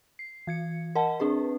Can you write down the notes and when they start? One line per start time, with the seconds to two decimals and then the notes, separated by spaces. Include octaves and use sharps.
0.19 C7
0.47 E3 G#6 C#7
0.95 A#4 D#5 F#5 A5
1.20 C4 D4 G#4 B4